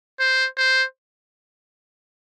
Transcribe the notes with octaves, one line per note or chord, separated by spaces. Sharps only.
C5
C5